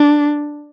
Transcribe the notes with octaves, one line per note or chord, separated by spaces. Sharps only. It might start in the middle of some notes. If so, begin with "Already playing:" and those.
Already playing: D4